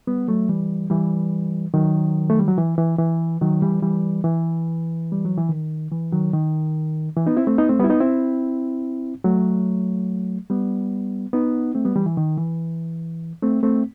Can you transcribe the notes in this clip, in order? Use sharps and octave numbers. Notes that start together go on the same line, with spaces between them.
G3 B3
F#3 A3
E3 G3
E3 G3
D#3 F#3
A3
G3
F#3
E3
E3
E3
D#3 F#3
E3 G3
E3 G3
E3
G3
F#3
E3
D#3
E3
D#3 F#3
D#3
E3
B3 D#4
C4 E4
A3 C4
B3 D#4
A3 C4
G3 B3
E4
B3 D#4
C4 E4
F#3 A3
G3 B3
B3 D#4
A3 C4
G3 B3
E3 G3
E3
D#3
E3
A3 C4
A3 C4